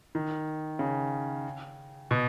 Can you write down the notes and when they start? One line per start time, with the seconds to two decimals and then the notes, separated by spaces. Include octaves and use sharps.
0.15 D#3
0.79 C#3
2.11 B2